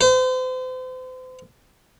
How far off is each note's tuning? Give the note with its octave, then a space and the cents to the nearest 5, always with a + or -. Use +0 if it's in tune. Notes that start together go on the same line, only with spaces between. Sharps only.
C5 -40